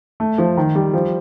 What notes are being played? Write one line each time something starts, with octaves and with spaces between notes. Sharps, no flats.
A3
F3
D#3
G3
F3